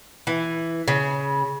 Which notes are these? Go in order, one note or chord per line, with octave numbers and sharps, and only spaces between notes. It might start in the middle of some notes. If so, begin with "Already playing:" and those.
E3
C#3